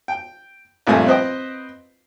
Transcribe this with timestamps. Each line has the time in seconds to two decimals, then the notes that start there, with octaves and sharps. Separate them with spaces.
0.08 G5
0.87 A#1 G2 A3 C4 G#5
1.06 C4 B4 C5 D#5 G5